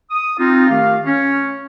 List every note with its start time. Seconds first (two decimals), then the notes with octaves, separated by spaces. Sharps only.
0.10 D#6
0.38 C4 D#4 F4
0.68 D#3 A3 G4 F5
1.04 C#4